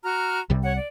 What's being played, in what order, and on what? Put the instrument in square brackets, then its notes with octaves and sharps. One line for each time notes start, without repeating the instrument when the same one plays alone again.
[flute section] F#4 A#5 F6
[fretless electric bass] C2 C3 G3
[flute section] C#5 F#5
D5